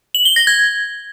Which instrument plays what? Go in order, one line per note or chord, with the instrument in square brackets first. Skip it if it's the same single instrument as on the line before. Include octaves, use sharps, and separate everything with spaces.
[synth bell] F#7
G7
A#6
G#6